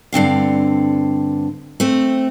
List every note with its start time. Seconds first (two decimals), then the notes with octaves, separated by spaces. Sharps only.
0.12 G2 D3 C4 F5
1.80 A3 C4